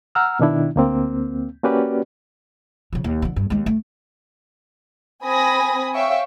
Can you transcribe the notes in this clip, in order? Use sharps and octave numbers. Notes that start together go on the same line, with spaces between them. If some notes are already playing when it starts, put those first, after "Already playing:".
F#5 A#5 E6 F6
B2 D#3 D4 E4
D2 A#3 C4
A#3 C#4 F#4 G4 B4 D5
C#3 F3
D#2
D3 F3
G2
D#2 G#3
A3
C4 G#5 B5 D#6 A#6
C#5 E5 F5 G5 C#6